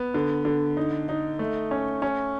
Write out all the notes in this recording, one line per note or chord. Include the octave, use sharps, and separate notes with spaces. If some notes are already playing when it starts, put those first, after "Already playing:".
Already playing: B3
D3
D3
D#4
D#4
A3
C#4
C#4